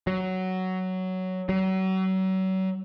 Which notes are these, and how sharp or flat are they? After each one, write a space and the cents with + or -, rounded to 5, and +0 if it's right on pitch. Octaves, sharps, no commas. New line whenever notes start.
F#3 +10
F#3 +35